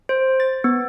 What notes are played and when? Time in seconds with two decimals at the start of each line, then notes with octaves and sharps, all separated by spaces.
0.09 C5
0.40 A6
0.64 B3